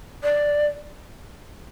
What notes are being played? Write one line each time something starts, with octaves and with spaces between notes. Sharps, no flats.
D5